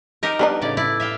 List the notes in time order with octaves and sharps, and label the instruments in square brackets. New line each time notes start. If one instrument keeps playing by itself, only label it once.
[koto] D#4 G4 A#4
[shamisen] G3 D4 D#4 [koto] B3
[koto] A2 C#3 D5
E4 D5
E5 F5 G5